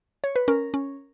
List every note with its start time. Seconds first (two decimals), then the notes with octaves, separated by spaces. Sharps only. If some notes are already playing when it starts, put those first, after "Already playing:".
0.24 C#5
0.36 B4
0.48 C#4 A#4
0.74 C#4